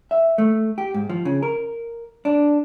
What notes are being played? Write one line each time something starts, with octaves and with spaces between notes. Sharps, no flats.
E5
A3
G4
G#2
F3
C#3
A#4
D4